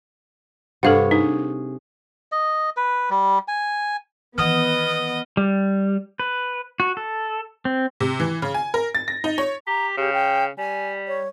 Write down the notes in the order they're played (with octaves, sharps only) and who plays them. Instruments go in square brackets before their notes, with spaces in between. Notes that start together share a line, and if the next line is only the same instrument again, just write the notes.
[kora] G2 C3 C#5 [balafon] A4 F5 F#5
[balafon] D#4 [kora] G#4
[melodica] D#5
B4
G3
G#5
[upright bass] D#3 E3 [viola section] B3 [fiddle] D#5 [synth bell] F#5 D#6 F6
[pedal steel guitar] G3
B4
F#4
A4
C4
[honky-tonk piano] C3
E3
C#3
G#5
A#4
A6
A#6
D#4
C#5
[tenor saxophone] G4 [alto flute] A#5
[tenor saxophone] C#3 [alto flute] G4
[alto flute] G5
[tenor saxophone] G3 [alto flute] G#5
[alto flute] C#5